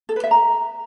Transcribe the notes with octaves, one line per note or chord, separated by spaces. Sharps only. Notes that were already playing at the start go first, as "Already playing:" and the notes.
A4
B4
E5
A#5